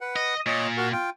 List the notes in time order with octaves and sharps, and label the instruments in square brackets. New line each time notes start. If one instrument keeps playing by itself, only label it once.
[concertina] B4 F#5
[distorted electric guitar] D#5
[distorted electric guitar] A#2 [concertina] C#5 D#5
[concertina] F#4 A#4
F4 G5